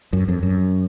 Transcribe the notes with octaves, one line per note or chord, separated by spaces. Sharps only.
F#2
F2
F#2